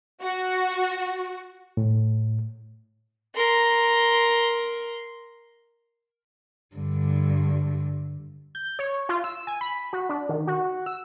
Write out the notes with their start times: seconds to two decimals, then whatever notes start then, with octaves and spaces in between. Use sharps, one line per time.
0.22 F#4
1.77 A2
3.35 A#4 C6
6.75 G2 D3
8.55 G6
8.79 C#5
9.09 F4
9.24 E6
9.47 G#5
9.61 B5
9.93 F#4
10.09 D4
10.29 D#3
10.47 F#4
10.86 E6